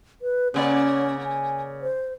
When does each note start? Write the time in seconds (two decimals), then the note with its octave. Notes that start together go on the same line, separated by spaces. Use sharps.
0.22 B4
0.54 C#3 A#3 C#4 D5
1.24 G#5
1.82 C5